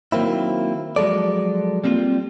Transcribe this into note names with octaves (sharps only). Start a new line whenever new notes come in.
D#3 F#3 A#3 C4 E4
F3 F#3 G#3 A4 D5
G3 A#3 C4 D4 F4